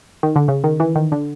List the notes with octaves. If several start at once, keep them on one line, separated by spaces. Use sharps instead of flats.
D#3
D3
C#3
D#3
E3
D#3
D3